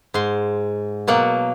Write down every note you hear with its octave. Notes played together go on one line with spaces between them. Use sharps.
G#2 C6
B2 F#3 A#3 F#5